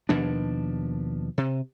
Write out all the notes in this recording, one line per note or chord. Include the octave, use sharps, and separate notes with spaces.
D#2 B2 F3 D4
C3